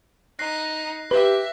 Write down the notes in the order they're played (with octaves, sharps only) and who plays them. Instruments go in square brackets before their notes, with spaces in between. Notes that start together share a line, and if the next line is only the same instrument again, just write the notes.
[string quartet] D#4 [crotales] F#6 A#6 C7
[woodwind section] G4 [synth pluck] B4 [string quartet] E5